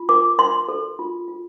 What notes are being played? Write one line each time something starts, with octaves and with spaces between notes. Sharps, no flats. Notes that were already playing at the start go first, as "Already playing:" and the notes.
Already playing: F4
A#4 D6
A#4 C6
A4
F4
F4